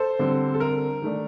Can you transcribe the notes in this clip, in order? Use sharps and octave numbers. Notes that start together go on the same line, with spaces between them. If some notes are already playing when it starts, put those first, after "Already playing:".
Already playing: A4 C5
D3 G3 C4
A4
A#4
D#3 A3 D4